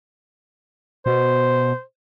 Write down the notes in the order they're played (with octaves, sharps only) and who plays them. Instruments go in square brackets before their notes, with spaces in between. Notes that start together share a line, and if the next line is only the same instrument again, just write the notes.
[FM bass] B2 [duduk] C5